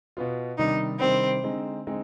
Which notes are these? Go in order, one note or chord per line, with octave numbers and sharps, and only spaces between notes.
B2 B3 F4
C3 D#3 G3 D4 D#4
C3 D#3 G3 C4 D4
D3 G#3 C4 D#4
D3 G#3 C4 D#4